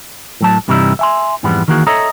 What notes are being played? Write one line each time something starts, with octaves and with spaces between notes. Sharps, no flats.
A2 F#3 A5
G2 C3 E3 G3 D#4 E4
E5 G#5 C6
F2 G#2 E3 G3 G#3 B3
D#3 E3 A#3 F#4 G#4
A4 C#5 D#5 E5 A#5